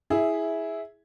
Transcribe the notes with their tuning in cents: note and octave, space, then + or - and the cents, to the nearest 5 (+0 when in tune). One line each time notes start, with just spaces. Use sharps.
E4 -10 G#4 +0 E5 +0